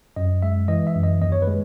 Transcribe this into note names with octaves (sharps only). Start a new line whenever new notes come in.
F#2 D#5
G#3 E5
E3 D#5
E5
F#2
D#5
D#2 D#5
C#5
B4
G#3